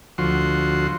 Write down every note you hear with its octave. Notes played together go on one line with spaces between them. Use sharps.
D2 F3 F#4 C6